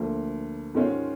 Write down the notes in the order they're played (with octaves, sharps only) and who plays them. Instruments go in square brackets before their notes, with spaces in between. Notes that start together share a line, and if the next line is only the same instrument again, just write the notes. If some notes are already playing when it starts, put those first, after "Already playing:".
Already playing: [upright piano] D2 D3 F3 A#3
G#2 D#3 G#3 C#4 F4